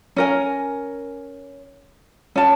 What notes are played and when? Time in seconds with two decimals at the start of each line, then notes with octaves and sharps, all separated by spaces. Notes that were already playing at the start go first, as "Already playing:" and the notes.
0.16 C#4 A#4 G#5
2.36 C#4 A5